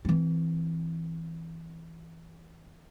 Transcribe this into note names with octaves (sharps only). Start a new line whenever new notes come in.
E3 C4